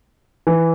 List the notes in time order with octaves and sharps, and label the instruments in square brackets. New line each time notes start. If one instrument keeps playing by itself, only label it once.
[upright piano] E3